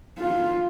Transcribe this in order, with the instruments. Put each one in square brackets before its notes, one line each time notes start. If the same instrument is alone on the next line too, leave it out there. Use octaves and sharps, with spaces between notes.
[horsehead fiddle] F4